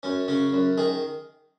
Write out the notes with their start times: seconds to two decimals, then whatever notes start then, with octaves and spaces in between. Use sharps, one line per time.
0.03 F#2 C#4
0.28 C#3 C#4
0.53 F#2
0.78 D#3 G#4